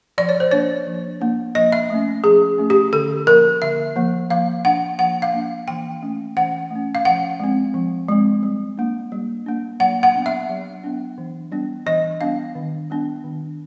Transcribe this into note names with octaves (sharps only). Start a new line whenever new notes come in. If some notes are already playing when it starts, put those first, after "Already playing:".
F3 D5
C#5
C5
A#3 D4 C#5
F3
A#3 D4
F3 D#5
E5
A3 C#4
F3 G#4
A3 C#4
G4
D3 A4
F3 A#3 A#4
D3 E5
F3 A#3
F3 F5
A#3 D4 F#5
F3 F#5
F5
A#3 D4
E3 G5
A3 C#4
E3 F#5
A3 C#4
F5
F3 F#5
G#3 C4
F3
G#3 C4
G3
A#3 D4
G3
A#3 D4
F#3 F#5
F#5
B3 D4
E5
F#3
B3 D4
E3
G3 B3 D4
E3 D#5
G3 B3 D4 F5
D#3
G3 B3 D4
D#3